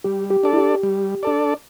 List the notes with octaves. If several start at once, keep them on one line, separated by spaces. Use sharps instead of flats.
G3 G4
G4
D4 A4 D5
E4
G4
G3
D4 A4 D5